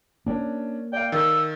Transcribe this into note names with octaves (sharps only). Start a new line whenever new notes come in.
A#3 C#4 D4
D5 F5 G5
D#3 A4